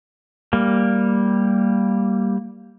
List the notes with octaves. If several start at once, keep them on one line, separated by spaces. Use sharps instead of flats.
G3 A#3